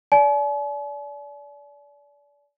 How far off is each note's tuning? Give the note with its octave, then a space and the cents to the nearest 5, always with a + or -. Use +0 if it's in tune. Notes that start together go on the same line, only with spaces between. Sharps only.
D5 -30 G#5 +45